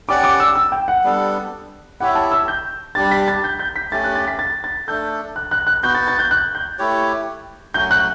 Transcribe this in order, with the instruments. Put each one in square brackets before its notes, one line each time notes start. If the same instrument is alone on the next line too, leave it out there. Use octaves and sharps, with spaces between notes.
[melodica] C#4 G4 D5 F#5 [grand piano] D6
[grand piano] D6
E6
E6
G5
F#5
[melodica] G3 B3 D4 A4
[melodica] E4 G4 C#5 E5 [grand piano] F#5
[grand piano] A5
E6
G6
[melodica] G3 D4 G4 [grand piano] A6
[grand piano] B6
A6
G6
G6
B6
[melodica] A3 C#4 G4 [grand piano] A6
[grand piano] F#6
A6
B6
A6
A6
[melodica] A3 D4 A4 [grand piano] G6
[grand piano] F#6
F#6
F#6
[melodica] B3 F#4 B4 [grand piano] G6
[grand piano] A6
A6
G6
F#6
G6
[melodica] A3 E4 G4 C#5
[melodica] F#3 A3 C#4 F#4 [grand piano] G6
[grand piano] F#6